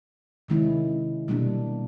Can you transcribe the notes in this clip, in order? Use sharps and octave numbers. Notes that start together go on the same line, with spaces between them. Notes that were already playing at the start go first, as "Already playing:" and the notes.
C3 D#3 G#3 C#4 E4
B2 G3 A#3 D4